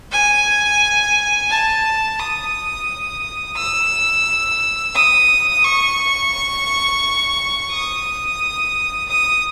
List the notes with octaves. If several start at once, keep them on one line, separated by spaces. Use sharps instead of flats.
G#5
A5
D#6
E6
D#6
C#6
D#6
D#6